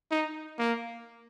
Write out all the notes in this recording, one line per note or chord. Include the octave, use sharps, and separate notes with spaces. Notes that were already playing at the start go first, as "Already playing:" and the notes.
D#4
A#3